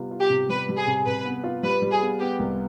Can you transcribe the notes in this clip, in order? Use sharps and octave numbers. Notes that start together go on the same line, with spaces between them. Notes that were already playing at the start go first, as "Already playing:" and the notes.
Already playing: C3 G3 B3 F4
F4
G4
C3
G3 B4
G3
G#4
C3
C3 B4
B3
F4
G3 B4
G3
G#4
B3
B3 G4
C2